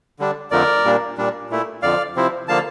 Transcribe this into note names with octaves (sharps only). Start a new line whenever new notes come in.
D3 G3 D4
F2 D3 F3 A3 A#4 D5
A#2 G3 A#3 D4
A#2 G3 D4
A#2 A3 E4
F2 D3 F3 D5 F5
C3 F3 C4 E4
D3 F3 A#3 F5 A5